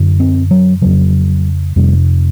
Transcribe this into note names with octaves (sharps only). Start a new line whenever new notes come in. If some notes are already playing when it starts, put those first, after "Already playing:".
Already playing: F#2 D3
C4
F#3
F2 C#3 F#3
F2 C3 G3